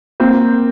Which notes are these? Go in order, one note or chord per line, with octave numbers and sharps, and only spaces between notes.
A#3 C4